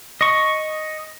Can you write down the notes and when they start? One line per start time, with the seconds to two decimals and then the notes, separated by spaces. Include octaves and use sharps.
0.21 D#5 C#6